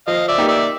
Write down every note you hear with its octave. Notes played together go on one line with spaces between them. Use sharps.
F3 D#5 F5
D5 E5
A#3 D#4 G4
D5 E5